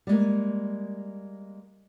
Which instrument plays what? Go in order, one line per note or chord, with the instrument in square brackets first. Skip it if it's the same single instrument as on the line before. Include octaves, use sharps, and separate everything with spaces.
[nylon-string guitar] G3 G#3 A#3